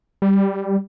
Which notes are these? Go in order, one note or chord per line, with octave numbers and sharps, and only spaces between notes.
G3